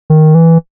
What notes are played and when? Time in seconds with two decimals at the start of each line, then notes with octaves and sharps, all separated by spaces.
0.10 D#3
0.35 E3